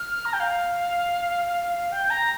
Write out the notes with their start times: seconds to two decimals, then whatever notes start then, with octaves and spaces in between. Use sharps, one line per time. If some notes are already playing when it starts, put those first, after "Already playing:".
Already playing: F6
0.25 A#5
0.33 G5
0.40 F5
1.92 G5
2.10 A#5